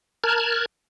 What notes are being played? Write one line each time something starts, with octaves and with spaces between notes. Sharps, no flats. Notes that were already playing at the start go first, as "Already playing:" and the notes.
A#4 A5 F6 F#6 G#6